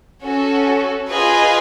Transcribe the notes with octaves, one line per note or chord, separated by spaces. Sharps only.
C#4 F#4 A4
F4 G#4 B4 D#5 G#5